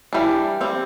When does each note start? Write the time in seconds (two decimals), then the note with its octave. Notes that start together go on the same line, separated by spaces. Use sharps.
0.13 E3 G3 D4
0.61 G3 C4